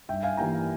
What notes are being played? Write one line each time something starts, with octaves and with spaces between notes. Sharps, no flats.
G2 E5 G5
F5 G#5
E3 G3 A#3 G5 A#5